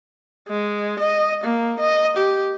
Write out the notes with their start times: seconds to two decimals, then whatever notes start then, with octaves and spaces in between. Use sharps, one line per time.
0.48 G#3
1.00 D#5
1.44 A#3
1.80 D#5
2.17 G4